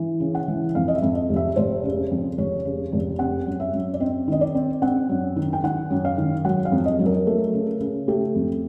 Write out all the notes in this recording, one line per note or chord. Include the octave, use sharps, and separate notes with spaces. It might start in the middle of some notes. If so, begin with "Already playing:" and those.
Already playing: E3
C#3
F#5
E3
F2 F5
D#5
E5
F2
D#5
F1
E5
F1 C5
C#3
F2
F1 C#5
C#3
F1
C4 F#5
F#2
E5
F#2
D5
C4 D#5
D#3 D#5
D5
C4
C4 F#5
F#2
D#3
G5
D#3 F#5
F#2
F5
D#3
F#3 F#5
F5
F2
D#5
F#3
A#4
A3
C#3
C#3
A3 G4
F2